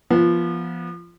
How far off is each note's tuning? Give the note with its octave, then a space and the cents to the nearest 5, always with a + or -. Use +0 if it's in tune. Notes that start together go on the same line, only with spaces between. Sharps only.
F3 -20 B3 -30